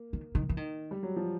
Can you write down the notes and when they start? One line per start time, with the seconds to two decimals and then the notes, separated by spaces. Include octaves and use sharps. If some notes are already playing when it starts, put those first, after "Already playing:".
Already playing: A#3
0.13 D#3
0.35 D#3
0.49 E3
0.57 D#3
0.91 G3
1.03 F#3
1.16 F3